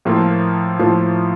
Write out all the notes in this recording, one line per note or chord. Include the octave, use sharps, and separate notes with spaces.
A2 F3 A#3 F4 A4
A2 F3 A#3 F4 A4